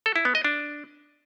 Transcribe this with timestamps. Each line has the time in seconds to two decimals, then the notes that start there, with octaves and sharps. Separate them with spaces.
0.06 A4
0.16 E4
0.25 B3
0.35 D#5
0.45 D4